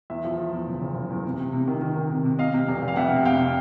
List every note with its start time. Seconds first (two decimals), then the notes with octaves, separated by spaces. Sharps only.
0.10 E2 E5
0.25 F3
0.38 F3
0.52 E2
0.66 F#1
0.81 F#1
0.96 F#1
1.10 E2
1.25 C3
1.39 C3
1.53 C3
1.68 D#3
1.81 D#3
1.96 D#3
2.11 C3
2.25 C3
2.39 C3 D#5 F5
2.54 C3
2.68 F1
2.82 F1
2.88 F5
2.96 F2 E5 F#5
3.11 C3
3.25 C3 F5 G5
3.39 C3